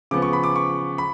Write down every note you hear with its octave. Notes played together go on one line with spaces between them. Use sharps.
C#3 F3 B3 D6
C#6
B5
D6
C#6
B5